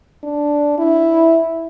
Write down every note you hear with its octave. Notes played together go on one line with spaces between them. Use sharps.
D4
E4